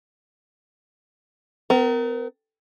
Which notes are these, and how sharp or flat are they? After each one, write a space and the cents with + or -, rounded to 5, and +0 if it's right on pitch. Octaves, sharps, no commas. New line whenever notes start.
B3 +45 A#4 +0